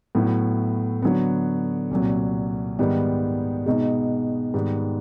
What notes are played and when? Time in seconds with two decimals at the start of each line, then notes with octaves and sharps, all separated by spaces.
0.15 A2 F#3 B3 E4
1.02 D3 F#3 B3
1.91 C2 A#2 F#3
2.79 G#2 D#3 G3 B3
3.66 B2 G#3 B3 D#4
4.54 G#2 D#3 G3 B3